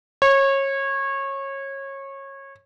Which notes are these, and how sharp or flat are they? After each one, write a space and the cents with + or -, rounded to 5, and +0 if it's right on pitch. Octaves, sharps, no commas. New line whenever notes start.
C#5 -25